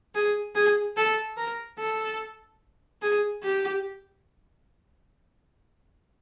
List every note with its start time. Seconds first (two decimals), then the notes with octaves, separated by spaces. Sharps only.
0.15 G#4
0.55 G#4
0.97 A4
1.37 A#4
1.79 A4
3.02 G#4
3.43 G4